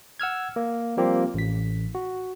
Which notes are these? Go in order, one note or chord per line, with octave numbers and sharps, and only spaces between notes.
F#5 E6 F6 G#6
A#3
F3 G3 A#3 C4 F4 G4
A1 B6
F#4